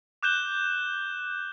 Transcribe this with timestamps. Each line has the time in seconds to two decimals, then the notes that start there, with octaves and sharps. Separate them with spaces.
0.23 D6 F#6 G6 E7 G7